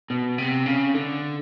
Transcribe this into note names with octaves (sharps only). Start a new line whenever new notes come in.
B2
C3
C#3
D3